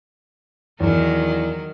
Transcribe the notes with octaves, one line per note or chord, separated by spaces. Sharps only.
E2 D#3 F#3 A#4